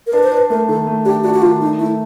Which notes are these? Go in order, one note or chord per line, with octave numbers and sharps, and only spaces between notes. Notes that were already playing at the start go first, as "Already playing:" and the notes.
A#4
D4 B4
C5
D4 B4
A3 A#4
D#3 A4
A3
D4 G4
D4 F#4
F#4
D#3 F4
A3 D#4
A3 E4